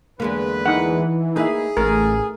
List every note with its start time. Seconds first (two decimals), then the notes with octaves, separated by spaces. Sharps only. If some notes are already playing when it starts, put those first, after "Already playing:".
0.20 E2 D3 G#3 A#3 B4
0.66 E3 D#4 F#5
1.36 A#3 D#4 G#4 B4 E5
1.77 A1 A3 A#4